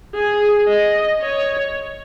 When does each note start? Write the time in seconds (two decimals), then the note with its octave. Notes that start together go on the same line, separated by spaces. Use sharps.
0.15 G#4
0.68 D#5
1.22 C#5